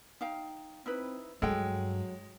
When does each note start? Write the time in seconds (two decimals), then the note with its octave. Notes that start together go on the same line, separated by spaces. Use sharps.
0.21 D#4 F5 G5
0.86 C4 D#4 E4 B4
1.42 G2 F#3 G#3 A4 G5